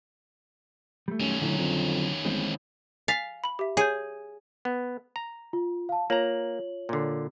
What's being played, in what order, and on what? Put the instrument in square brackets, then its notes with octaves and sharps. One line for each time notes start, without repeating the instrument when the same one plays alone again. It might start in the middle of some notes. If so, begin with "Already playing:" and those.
[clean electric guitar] G3 A3
[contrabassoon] F#2 [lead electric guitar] D#3 C#4
[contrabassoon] A2 [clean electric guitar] D3 F3 F#3
[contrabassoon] F2
[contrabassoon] G1 [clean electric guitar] E3 G#3 C4
[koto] F5 [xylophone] G#5 A6 B6
[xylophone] B5 F#7
G4 E5
[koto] G#4 [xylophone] C#5 G6
[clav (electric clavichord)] B3
A#5
[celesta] F4
F5 A5
[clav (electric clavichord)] A#3 A#5 [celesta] F4 C#5 F#7
[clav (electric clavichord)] A#2 D3